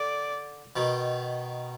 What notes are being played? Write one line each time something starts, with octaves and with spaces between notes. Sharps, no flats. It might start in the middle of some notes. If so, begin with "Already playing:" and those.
Already playing: D3 D5
B2 D#3